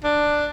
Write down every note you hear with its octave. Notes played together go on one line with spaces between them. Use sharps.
D4